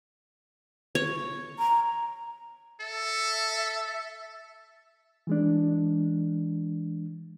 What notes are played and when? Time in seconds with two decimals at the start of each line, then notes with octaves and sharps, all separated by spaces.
0.95 C#5
1.59 A#5
2.81 A4 E5
5.27 E3 G#3 D4